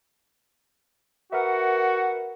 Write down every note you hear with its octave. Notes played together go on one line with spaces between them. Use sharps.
F#4 A#4 B4 E5 F#5